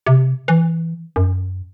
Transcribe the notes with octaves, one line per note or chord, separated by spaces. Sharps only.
C3
E3
F#2